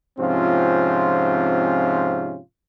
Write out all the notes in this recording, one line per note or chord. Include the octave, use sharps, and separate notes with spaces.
G#2 C3 F3 C4 C#4 F4